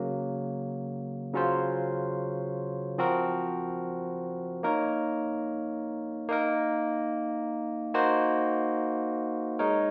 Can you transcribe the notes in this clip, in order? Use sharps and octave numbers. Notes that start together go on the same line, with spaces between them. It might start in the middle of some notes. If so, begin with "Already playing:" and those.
Already playing: C#3 F#3 A#3
C#3 F#3 C#4 F4 C5
F3 C4 F#4 A#4
A#3 D#4 A#4 C#5
A#3 D#4 A#4
A#3 D#4 F#4 C5
G#3 D#4 A#4 C#5